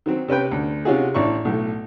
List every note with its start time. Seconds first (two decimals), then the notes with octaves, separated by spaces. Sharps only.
0.06 D#3 F#3 C4
0.28 C3 C#4 B4 G5
0.51 D2
0.85 C3 C#4 D#4 F4 F#4 G#4
1.14 A1 D4 E4 D5 C#6
1.45 B1 A2